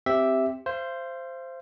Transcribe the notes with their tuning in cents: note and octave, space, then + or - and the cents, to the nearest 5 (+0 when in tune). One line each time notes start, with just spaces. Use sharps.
C4 +0 G4 +0 E5 +0
C5 +0 F5 -45